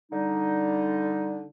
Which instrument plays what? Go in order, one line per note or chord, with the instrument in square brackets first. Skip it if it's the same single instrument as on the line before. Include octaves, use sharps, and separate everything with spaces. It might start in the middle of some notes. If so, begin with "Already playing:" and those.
[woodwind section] D3 G3 D#4